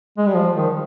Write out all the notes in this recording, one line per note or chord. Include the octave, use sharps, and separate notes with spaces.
G#3
G3
F3
D#3